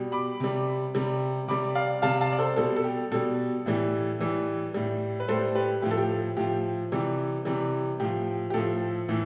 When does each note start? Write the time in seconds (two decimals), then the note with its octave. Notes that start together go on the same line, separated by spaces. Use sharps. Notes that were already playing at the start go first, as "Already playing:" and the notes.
Already playing: B2 G3
0.12 B5 D6
0.40 C3 G3
0.95 C3 G3
1.48 C3 G3 B5 D6
1.75 D5 F5
2.02 C3 G3 F5 A5
2.21 F5 A5
2.32 D5
2.39 A4 C5
2.56 B2 G3 A4
2.76 A4
2.84 G4
3.12 B2 G3 A4
3.66 A2 E3 G3
4.19 A2 E3 G3
4.74 A2 G3
5.20 B4
5.28 A2 G3 A4 C5
5.55 G4 B4
5.82 A2 F3 G4
5.91 A4
5.98 G4
6.37 A2 F3 G4
6.92 C3 E3 G3
7.45 C3 E3 G3
8.00 A2 F3 G4
8.50 G4
8.54 A2 F3 A4
9.09 A2 E3